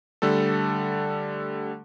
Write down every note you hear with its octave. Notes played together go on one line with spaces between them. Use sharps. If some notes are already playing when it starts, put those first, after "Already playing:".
D3 G3 A3 A4